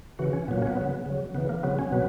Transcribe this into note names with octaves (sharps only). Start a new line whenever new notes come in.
C#3 E3 F#4
C#4
A#2 F#3 B3
A#3
C#4
B3
C#3 F#3
C#3 F#3
C#3 E3 B3
A#3
C#3 F#3 B3
C#4
B2 F#3 B3